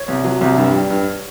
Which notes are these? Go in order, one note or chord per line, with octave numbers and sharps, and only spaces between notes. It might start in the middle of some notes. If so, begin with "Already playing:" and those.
Already playing: C#5
C2
F#3
C2
G2
G3
G2